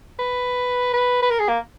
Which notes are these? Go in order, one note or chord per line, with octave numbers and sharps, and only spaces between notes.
B4
B4
B4
A#4
G#4
A#3